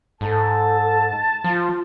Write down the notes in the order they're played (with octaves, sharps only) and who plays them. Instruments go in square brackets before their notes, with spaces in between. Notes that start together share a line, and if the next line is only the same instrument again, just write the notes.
[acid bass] G#2 [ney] A4 [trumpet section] A5
[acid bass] F3 [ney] F4